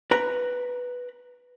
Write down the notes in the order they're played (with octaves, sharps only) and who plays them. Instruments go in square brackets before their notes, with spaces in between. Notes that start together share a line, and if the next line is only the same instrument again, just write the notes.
[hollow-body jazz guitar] B4 A#5